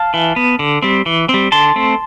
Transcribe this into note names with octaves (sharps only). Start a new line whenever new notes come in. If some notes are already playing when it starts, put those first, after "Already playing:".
Already playing: F5 A5
E3
B3
D3
G3 C4
E3
G3 C4
D3 A5 C6
A3 C4